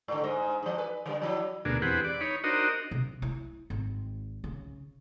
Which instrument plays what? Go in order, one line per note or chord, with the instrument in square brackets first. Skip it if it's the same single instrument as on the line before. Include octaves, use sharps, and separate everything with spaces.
[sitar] G#2 D3
G#2 D#5
G#2 F3
B4
D3 F#3 G3
F3 F#3 E4
[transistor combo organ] D2 B2 A#3 D4 G#4
E2 C4 G4 G#4 B4 F#5
D5
D#4 C#5 B5
D4 D#4 F#4 A#4 C5 D#5
[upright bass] C3
E4
G#1
C#3